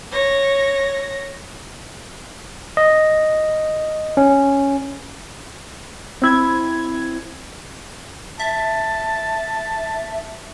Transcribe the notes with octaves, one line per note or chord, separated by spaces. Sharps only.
C#5 A#6
D#5
C#4
C4 E4 G#6
E5 A5